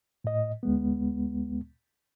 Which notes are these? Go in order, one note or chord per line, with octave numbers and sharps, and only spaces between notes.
A2 D#5
D2 G#3 B3